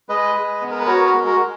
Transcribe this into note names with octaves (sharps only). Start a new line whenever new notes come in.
G#3 B4 D#5
G#3
B3
A#4
B4
F#4 A#4 C#5
A#4
G#3
A#4
G#3